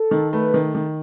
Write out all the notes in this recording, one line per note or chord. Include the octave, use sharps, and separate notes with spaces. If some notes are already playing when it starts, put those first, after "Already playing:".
Already playing: A4
D#3
A3 B4
D#3
D#3